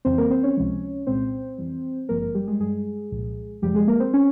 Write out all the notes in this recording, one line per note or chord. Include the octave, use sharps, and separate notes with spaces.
F2 C#3 E3 G3 C4 C5
A#3 A#4
C4 C5
C#4 C#5
C#2 C3 F3 G#3
C2 A#2 G#3 C4 C5
F2 E3 G3
G#1 G2 F3 G#3 A#3 A#4
A#3 A#4
G3 G4
G#3 G#4
G2 G3 G#3 G#4
C2 A#2 F3
F2 C3 F3 G3 G#3 G4
G#3 G#4
A#3 A#4
C4 C5
C#4 C#5